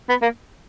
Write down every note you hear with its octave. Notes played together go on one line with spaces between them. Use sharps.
B3
A#3